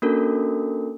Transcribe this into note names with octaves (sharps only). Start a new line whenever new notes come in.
A#3 C#4 D4 F#4 A4 A#4